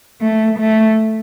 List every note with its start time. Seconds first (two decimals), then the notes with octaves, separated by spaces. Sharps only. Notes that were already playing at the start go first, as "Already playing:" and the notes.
0.21 A3
0.58 A3